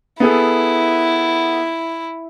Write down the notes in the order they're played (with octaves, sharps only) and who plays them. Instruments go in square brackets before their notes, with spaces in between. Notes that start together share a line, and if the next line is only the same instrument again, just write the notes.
[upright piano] B3 G#4 A4 [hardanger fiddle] E4